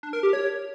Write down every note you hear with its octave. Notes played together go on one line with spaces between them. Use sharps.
D4
A#4
G4
C#5